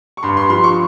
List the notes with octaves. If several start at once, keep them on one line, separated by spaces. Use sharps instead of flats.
C#6
G2 C6
C6
F3 C6
C#6